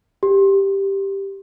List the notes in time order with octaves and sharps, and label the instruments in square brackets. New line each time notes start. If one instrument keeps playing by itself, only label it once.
[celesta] G4